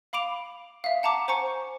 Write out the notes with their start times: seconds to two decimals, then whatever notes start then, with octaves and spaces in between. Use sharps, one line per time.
0.13 F5 B5 D6 D7 F7
0.84 E5 F5
1.03 F#5 A5 A#5 D6
1.28 C5 G#5 A#5 C#6 C#7